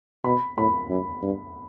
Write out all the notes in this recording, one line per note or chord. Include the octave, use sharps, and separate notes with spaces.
B2 B5
A2 B5
F#2
G2